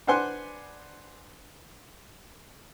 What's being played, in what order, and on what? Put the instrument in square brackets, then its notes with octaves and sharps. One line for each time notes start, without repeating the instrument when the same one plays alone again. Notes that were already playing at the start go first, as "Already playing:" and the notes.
[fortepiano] D4 B4 C5 F#5 G#5 C6